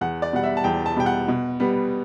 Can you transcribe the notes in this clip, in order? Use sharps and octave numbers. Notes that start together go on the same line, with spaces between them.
E2 F#5
D5
B2 G3 F#5
E5
A5
E2 G5
A5
B2 G3 G5
F#5
B2
G3 B3